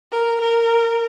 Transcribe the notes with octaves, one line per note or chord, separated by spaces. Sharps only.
A#4
A#4